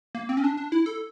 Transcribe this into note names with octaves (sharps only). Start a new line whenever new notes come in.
A#3
C4
C#4
D4
D4
E4
A4